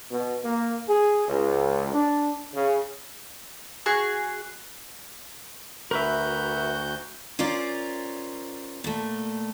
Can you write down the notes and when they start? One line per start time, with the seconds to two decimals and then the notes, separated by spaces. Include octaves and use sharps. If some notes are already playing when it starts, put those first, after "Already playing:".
0.11 B2
0.45 A#3
0.89 G#4
1.28 C#2
1.94 D4
2.55 C#3
3.86 F#4 G#4 C#6
5.91 D2 F#4 A#4 B4 E5 G6
7.39 C#4 F4 A#4 C5 D5
8.84 A#2 A3